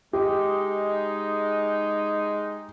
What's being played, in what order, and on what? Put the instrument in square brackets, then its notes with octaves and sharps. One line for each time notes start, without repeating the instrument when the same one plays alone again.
[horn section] G#3 D#4 [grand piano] G4